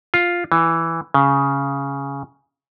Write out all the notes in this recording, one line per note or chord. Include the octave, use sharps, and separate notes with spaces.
F4
E3
C#3